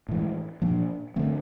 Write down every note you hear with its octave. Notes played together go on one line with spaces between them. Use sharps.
A2 E3 G#3
A#2 F3 A#3 D4
D3 F#3 A3 C4